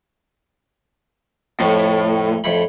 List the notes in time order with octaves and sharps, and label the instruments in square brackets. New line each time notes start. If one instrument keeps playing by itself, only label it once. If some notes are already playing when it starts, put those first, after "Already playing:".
[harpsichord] F2 [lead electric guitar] A2
[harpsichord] F2 A2 B5